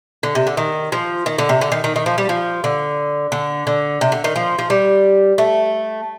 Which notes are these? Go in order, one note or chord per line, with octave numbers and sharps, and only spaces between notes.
D3
C3
D3
D#3
F3
D#3
D3
C3
D3
D#3
D#3
D#3
F3
G3
F3
D3
D3
D3
C3
D3
D#3
F3
F3
G3
A3